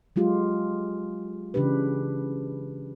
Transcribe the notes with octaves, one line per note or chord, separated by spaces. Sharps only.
F#3 G#3 F4 G4
C#3 E3 D4 G4 B4